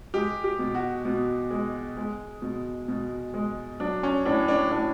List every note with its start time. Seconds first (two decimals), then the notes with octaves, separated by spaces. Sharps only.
0.14 G#3 G4
0.44 G4
0.59 B2
0.75 F#4
1.05 B2
1.51 G#3
1.97 G#3
2.42 B2
2.88 B2
3.34 G#3
3.80 F#3 D4
4.03 C#4
4.26 A2 D4
4.48 D4
4.71 A2 D4